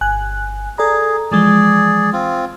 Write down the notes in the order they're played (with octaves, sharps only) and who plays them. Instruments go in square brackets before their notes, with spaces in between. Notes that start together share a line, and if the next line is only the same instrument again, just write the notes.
[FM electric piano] G1 G#5 F#6
[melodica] G#4 [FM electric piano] A4 D5 A#5
[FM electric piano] E3 F3 G#3 [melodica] G#4 D5
[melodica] C4 F4